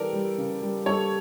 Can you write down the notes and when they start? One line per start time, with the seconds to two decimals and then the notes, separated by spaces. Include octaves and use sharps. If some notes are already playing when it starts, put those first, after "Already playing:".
Already playing: E3 G3 G4 A4 A#4 D5
0.13 G3
0.38 C#3
0.62 G3
0.86 G3 A4 C#5